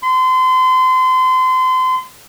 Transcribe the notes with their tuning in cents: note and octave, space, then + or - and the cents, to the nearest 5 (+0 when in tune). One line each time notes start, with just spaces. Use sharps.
C6 -30